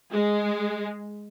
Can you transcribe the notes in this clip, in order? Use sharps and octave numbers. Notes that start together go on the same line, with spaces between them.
G#3